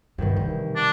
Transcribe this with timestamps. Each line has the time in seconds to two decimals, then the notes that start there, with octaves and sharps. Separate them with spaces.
0.18 C2 G2 B2 D3 D#3
0.36 E3
0.75 D4